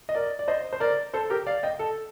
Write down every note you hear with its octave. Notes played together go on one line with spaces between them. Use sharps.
D#5
A#4 D5
D5
C5 D#5
C5
A#4 D5
A4 C5
G4 A#4
D5 F5
D#5 G5
A4